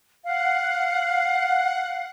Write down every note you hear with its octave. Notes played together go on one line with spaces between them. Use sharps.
F5 F#5